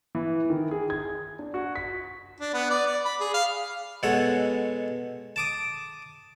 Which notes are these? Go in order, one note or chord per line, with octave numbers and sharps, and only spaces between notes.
E3
D#3
G#4
G#6
D4
F#4
B6
D4
B3
D5
D5
B5
G#4
F5
B2 G#3 A4 C#5 F#5
A5 D6 D#6